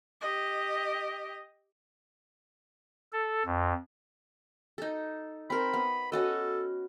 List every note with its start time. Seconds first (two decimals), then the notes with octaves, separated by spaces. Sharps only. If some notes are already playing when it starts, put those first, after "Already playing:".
0.21 G4 D#5
3.13 A4
3.46 F2
4.78 D#4 A4
5.50 C4 A#4 B5
5.74 B3
6.12 C#4 F#4 A4 D#5